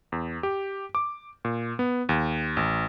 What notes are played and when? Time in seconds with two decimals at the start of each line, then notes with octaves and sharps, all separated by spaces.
0.12 E2
0.43 G4
0.95 D6
1.45 A#2
1.79 B3
2.09 D#2
2.57 A1